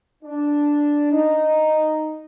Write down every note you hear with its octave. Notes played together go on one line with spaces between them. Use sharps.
D4
D#4